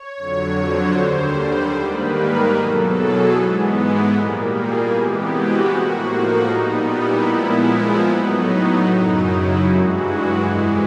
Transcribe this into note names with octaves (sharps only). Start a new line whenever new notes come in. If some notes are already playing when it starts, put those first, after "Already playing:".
Already playing: C#5
F2 D3 F#3
C5
D#2 D3 G3
G#2 D#3 G3 A#3 B4
A#4
E2 B2 F#3 A4
G#4
G#2 E3 G#3 B3
A#2 G3 A#3
G#4
C3 E3 G#3 B3 G4
F#4
A2 F3 A#3
D#4
A#2 G3 B3
E4
A#2 F3 G#3 B3
A2 F#3 B3 D#4
F#2 C#3 F#3
E4
G2 E3 G#3 F#4
F2 C3 E3 G#3